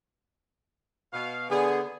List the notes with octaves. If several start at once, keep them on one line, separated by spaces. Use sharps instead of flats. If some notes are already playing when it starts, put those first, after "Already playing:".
B2 F5
D3 B3 G#4